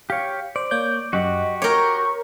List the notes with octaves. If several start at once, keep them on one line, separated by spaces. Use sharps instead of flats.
G4 C#5 F5
C5 D5
A#3 C#5 G6
F#2 F#4 G4 D#5 F#5
A#4 C#5 C#6 D6 G6 A#6